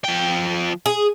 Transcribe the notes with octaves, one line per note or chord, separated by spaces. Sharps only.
F3 G5
G#4